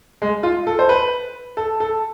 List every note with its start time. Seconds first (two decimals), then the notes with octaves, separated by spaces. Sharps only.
0.22 G#3
0.43 F4
0.67 A4
0.79 C5
0.89 B4
1.57 A4
1.80 A4